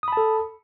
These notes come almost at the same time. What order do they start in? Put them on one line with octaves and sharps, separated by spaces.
D#6 B5 A5 A4